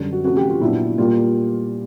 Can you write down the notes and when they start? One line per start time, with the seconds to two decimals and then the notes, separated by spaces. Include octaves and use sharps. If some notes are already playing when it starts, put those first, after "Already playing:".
Already playing: F#2 D3 G3
0.12 F#4
0.24 C3 F3 A3 C#4 F#4
0.37 G4
0.49 F4
0.61 A#2 F#3 B3 D4 E4
0.98 A#2 G3 A#3 F4